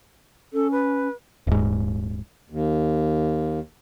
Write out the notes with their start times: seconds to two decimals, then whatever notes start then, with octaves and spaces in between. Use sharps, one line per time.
0.53 C#4 A4
0.71 B4
1.47 D#1 G#2
2.50 D#2